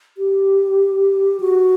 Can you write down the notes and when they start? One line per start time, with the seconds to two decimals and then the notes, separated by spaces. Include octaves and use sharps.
0.18 G4
1.40 F#4